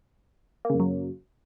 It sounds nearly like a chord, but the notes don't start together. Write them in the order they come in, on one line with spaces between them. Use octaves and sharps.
A#3 C#3 F#2 F#3